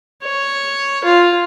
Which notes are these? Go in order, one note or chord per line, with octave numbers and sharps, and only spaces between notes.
C#5
F4